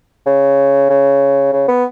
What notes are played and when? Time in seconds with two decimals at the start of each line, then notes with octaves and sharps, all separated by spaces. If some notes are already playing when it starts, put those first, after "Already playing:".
0.26 C#3
0.90 C#3
1.53 C#3
1.68 B3